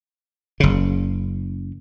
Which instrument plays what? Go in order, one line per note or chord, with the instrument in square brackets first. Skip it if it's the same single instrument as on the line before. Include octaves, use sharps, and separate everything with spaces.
[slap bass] F#1 C#3